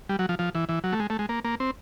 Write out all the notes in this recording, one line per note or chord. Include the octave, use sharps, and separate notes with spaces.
G3
F#3
F3
F3
E3
E3
F#3
A3
G#3
A3
G#3
A#3
A#3
C4